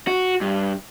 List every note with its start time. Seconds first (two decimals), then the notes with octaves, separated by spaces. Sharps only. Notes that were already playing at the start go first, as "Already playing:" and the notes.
0.07 F#4
0.41 G2